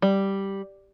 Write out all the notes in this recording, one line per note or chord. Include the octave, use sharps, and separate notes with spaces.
G3